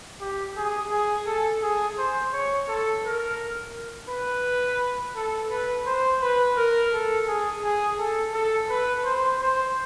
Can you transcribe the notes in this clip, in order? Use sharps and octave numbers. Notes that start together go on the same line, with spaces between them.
G4
G#4
G#4
A4
G#4
C5
C#5
A4
A#4
B4
A4
B4
C5
B4
A#4
A4
G#4
G#4
A4
A4
B4
C5
C5